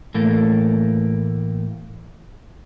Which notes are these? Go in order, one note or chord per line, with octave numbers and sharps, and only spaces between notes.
A2 E3 A3 A#3